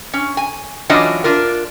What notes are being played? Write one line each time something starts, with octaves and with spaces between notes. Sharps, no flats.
C#4
G#5
E3 F#3 C#4 D4 F4 D#5
D4 F4 A#4